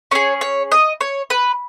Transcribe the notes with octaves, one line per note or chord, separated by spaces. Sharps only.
C#4 G#4 C#5
C#5
D#5
C#5
B4